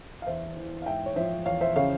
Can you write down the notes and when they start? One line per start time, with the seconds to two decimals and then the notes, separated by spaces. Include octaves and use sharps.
0.22 F5
0.27 E2 C5 E5
0.57 E3
0.82 F5
0.86 G#2 E5 G5
1.06 C#5
1.16 F3 C5 E5
1.46 E2 C#5 F5
1.61 C5 E5
1.76 C#3 C#5 F5